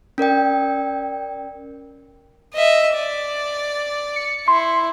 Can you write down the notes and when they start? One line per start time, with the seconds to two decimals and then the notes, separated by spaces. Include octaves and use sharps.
0.18 C#4 A#4 D5 G5
2.54 D#5 E5
2.94 D5
4.16 C#7
4.48 E4 C6